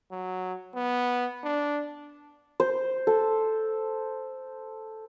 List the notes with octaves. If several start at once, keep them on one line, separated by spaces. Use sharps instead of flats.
F#3
B3
D4
C5
A4